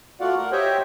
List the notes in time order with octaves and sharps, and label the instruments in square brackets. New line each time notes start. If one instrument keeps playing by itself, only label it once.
[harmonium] A3 F4 F#4 D5 F5 F#5
A#4 F#5
G4 C5 C#5 D#5 E5 G5